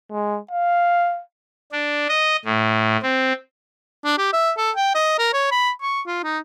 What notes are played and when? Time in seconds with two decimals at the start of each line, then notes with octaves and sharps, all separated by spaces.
0.12 G#3
0.51 F5
1.72 D4
2.09 D#5
2.45 A2
3.02 C4
4.05 D4
4.18 G4
4.33 E5
4.57 A4
4.76 G5
4.95 D#5
5.18 A#4
5.33 C#5
5.51 B5
5.82 C#6
6.07 F4
6.23 D#4